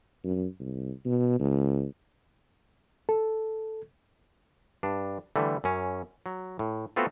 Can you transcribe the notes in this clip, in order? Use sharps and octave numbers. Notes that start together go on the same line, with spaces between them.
F#2
C2
B2
C#2
A4
G2 D4
D3 E3 G3 A3
F#2 C#4
F#3
A2
A3 B3 C4 F4 F#4 A4